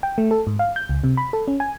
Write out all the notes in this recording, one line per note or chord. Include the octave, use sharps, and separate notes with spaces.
G5
A3
A4
G#2
F5
G6
C#2
C3
B5
A4
C#4
G#5